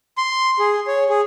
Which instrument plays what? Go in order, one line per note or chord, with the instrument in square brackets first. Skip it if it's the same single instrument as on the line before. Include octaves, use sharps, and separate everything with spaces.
[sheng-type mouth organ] C6
G#4
C#5
G#4